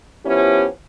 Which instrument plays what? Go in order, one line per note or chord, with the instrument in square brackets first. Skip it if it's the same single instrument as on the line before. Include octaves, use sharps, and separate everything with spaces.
[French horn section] F3 B3 C#4 E4 G4